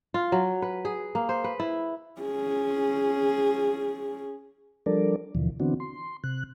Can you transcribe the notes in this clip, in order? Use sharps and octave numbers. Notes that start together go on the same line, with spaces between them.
F4
F#3
B4
G#4
A#3
C5
B4
E4
C#4 G#4
F3 G3 D4 A4 A#4 D5
D#2 B2 D3 E3 F3
D3 E3 B3 C4 D4 F#4
C6
C3 F#6